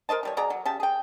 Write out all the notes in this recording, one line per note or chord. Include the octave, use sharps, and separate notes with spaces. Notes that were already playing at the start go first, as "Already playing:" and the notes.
A#4 C5 D#5 A5
E3 G3 C#5
B2 G#4 D5 A#5
F#3
C#3 G4 A5
G#4 G5